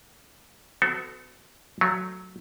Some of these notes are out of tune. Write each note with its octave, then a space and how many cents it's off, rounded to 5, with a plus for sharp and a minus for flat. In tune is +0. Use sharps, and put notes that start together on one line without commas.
B3 +45 F#4 +0 A4 +0
F#3 +0 A3 +5